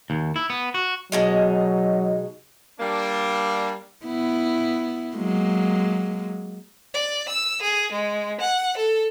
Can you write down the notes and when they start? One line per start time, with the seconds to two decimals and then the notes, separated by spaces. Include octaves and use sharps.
0.10 D#2
0.36 E4
0.50 B3
0.74 F#4
1.12 B2 F#3 G#3 D#4
2.80 G3 A#3 D4
4.05 B3 E4
5.16 F#3 G#3 A#3
6.94 D5
7.28 E6
7.61 G#4
7.92 G#3
8.41 F#5
8.76 A4